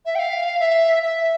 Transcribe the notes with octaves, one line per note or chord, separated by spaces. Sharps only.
E5
G5
F5
E5
E5